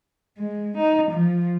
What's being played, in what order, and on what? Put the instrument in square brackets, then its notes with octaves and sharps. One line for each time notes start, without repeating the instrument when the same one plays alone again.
[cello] G#3
D#4
F3